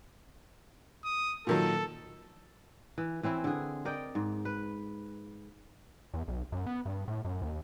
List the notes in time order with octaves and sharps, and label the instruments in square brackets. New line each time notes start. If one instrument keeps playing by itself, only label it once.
[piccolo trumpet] D#6
[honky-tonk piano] A#2 D#3 F#3 [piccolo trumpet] A4
[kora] E3
E3 C4 C#4 E4
D3 G#4
A#4 D5 D#5 G5
G#2
B4
[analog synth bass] E2
B1
F#2
B3
G2
A2
F#2
D#2